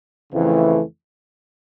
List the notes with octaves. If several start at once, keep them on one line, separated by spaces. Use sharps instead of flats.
F2 C#3 E3 A3